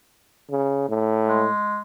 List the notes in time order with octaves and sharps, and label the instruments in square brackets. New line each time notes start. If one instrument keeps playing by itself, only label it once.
[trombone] C#3
A2
[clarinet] G#3